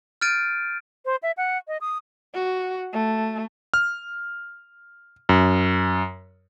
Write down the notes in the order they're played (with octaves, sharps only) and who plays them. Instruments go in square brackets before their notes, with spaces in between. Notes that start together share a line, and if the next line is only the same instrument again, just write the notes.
[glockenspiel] F6 G6 A6 D7 D#7
[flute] C5
E5
F#5
D#5
D#6
[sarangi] F#4
A3
[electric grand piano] F6
F#2